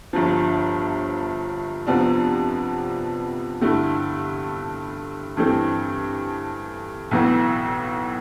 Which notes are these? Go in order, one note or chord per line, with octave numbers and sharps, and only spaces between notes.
G1 G2 F3
F2 C3 F3 B3 D4
G2 D3 A3 E4
G2 E3 A3 C4
B1 A2 E3 B3